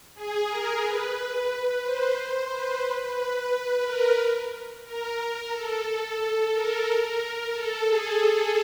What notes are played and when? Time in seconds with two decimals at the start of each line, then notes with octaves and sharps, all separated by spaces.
0.14 G#4
0.48 A#4
0.82 B4
1.49 B4
1.82 C5
2.16 C5
2.50 B4
3.17 B4
3.83 A#4
4.85 A#4
5.51 A4
5.85 A4
6.53 A#4
7.53 A4
7.86 G#4